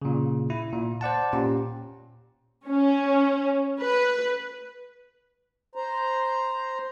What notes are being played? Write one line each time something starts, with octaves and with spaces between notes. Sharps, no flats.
A#2 C#3
E4
A#2
C5 D5 F#5 A5
A#2 C#4 G4
C#4
B4
C5 A#5